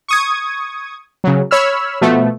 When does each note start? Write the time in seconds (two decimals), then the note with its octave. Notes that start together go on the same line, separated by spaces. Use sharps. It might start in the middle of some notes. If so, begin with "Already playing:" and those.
0.08 C#6 D#6 G#6
1.24 C#3 F#3
1.51 C#5 B5 E6 F6
2.01 B2 F3 A3 B3